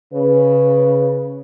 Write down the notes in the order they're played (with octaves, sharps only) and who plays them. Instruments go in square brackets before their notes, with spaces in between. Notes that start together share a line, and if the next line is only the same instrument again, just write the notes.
[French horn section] C#3 B4